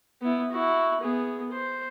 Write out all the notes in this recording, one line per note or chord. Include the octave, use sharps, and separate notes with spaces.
B3 E4
E4 F#4
B3 G#4
C5